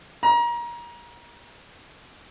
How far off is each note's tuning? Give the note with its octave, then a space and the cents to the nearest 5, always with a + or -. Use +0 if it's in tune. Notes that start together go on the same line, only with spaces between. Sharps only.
A#5 +30